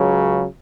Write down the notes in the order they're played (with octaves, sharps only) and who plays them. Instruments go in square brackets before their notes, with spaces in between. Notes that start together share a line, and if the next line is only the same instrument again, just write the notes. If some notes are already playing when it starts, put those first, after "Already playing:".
Already playing: [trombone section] C#2 C#3 F#3